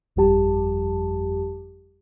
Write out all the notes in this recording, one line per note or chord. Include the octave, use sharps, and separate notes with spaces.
G1 F2 F3 G3 G4 A5